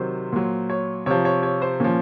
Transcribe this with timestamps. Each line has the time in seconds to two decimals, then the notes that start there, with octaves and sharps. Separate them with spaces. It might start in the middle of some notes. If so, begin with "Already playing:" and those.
Already playing: C3 D#3 F#3 C5
0.32 A#2 F#3
0.70 C#5
1.06 C3 F3 C#5
1.25 C#5
1.43 C#5
1.62 C5
1.80 A#2 F3 C#4